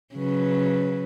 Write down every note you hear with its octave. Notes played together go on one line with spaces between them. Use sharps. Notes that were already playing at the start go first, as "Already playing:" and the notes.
C#3 F#3 B4